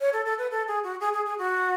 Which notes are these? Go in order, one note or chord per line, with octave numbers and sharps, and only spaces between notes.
C#5
A4
A4
B4
A4
G#4
F#4
G#4
G#4
G#4
F#4